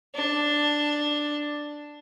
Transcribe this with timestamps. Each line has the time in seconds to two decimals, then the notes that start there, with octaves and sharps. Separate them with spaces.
0.15 D4